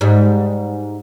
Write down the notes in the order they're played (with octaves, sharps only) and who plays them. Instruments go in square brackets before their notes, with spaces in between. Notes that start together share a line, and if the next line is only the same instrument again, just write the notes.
[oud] G#2 G3